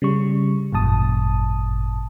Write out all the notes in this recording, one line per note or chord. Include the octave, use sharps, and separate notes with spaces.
C#3 G3 C#6
G#1 F#2 A#2 A5 D#6